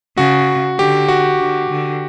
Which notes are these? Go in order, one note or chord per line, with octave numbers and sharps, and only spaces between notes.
C#3 F#4
D3 G4
F#4
D3
D3